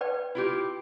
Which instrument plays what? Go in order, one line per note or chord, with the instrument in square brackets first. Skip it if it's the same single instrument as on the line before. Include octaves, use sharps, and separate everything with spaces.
[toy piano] B4 D5 G5
[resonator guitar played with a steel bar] E4 F4 G4